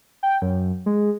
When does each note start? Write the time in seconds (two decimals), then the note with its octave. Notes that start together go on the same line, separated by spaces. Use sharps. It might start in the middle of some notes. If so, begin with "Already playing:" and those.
0.23 G5
0.42 F#2
0.86 G#3